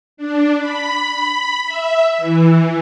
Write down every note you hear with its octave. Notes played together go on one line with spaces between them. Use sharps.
D4
B5
E5
E3